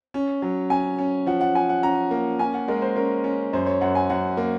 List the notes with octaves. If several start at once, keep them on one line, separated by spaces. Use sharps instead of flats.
C#4
F#3
C#4 G#5
C#4
F3 F#5
F#5
F3 G#5
F#5
C#4 A#5
A#3
C#4 G#5
F#5
G#3 A#4
C5
C#4 A#4
C#4
F#2 C5
C#5
F#2 F#5
G#5
F#2 F#5
A#3